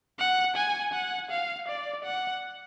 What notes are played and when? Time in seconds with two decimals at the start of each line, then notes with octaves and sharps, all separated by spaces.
0.19 F#5
0.56 G#5
0.93 F#5
1.31 F5
1.68 D5
2.04 F#5